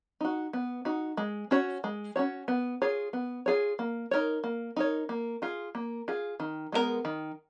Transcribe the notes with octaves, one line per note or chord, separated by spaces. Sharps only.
D#4 F#4
B3
D#4 F#4
G#3
C#4 F#4 C#5
G#3
C#4 F#4 C#5
B3
F4 G#4 C#5
B3
F4 G#4 C#5
A#3
D#4 A#4 C#5
A#3
D#4 A#4 C#5
A#3
F4 G#4
A#3
F4 G#4
D#3
G#3 B3 D#4 A#4
D#3